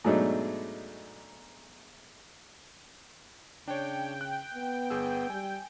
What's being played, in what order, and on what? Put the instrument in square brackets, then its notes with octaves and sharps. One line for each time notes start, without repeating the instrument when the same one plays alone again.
[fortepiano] G#2 B2 F#3 A3 D4 D#4
[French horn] C#3 [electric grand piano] D4 C#5 [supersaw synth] G5
[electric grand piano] F#6
[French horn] B3
[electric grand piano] G1 G#4 E6
[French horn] G3 [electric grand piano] G#5